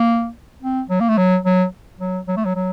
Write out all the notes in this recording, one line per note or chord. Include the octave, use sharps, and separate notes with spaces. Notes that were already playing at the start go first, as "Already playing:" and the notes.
Already playing: A#3
C4
F#3
A#3
A3
F#3
F#3
F#3
F#3
A3
F#3
F#3